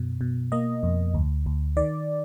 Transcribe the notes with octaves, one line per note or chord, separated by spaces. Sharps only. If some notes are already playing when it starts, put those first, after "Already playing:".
Already playing: F#2 B2
B2
A#3 D#5
F2
D2
D2
D#3 D5